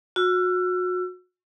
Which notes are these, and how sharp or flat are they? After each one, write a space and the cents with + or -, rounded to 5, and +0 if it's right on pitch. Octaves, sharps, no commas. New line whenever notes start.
F#4 -30 E6 +35